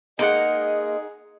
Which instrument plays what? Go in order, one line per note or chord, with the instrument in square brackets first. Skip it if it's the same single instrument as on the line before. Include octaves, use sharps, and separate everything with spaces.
[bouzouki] G#3 A#3 [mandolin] D#4 F#5 [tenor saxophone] G#4 [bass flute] D#5